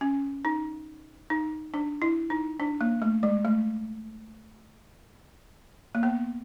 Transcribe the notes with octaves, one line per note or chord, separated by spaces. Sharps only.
C#4
D#4
D#4
D4
E4
D#4
D4
A#3
A3
G#3
A3
A#3
B3